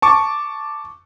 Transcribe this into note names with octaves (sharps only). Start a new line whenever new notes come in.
A5 C#6 D6